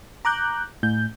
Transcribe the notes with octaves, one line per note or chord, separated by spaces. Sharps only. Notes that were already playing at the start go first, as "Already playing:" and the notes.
A#5 D6 F#6 G6
A2 G6